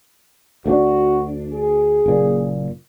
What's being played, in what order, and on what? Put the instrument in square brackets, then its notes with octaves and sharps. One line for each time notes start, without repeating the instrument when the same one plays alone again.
[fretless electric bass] D2 A3 D4 [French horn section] F#4
[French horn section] G#4
[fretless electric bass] F#1 A#2